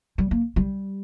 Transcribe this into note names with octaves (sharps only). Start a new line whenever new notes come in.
G3
A#3
G3